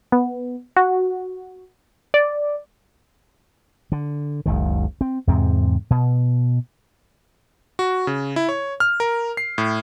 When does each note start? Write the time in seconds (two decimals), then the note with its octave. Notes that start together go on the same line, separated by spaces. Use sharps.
0.12 B3
0.77 F#4
2.14 D5
3.92 D3
4.46 F#1 C#2 D#3
5.01 C4
5.27 E2 G#2 C3 C4
5.91 B2
7.79 F#4
8.07 C#3
8.36 E4
8.49 C#5
8.80 F6
9.00 A#4
9.37 C7
9.58 A2